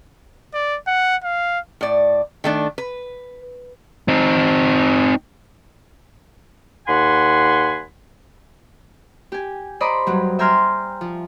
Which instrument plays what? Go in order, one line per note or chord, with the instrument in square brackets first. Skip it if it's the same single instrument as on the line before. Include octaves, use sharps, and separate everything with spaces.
[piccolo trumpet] D5
F#5
F5
[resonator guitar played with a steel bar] A2 D5
D#3 A3 D4
B4
[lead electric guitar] C4 D#4
[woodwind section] D#2 F#5 G#5 B5 C6
[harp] G4 G#5
C5 D5 D#5 A#5 B5
G2 F#3 G3
E5 G5 G#5 A#5 C6 F6
F3